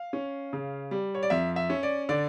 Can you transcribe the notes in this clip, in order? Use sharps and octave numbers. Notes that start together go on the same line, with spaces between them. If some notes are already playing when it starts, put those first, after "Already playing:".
Already playing: F5
C#4
C#3
G3
C#5
D5
F2 E5
E5
C#4
D5
D3 D5